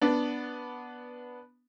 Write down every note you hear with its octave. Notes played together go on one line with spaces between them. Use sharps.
B3 D4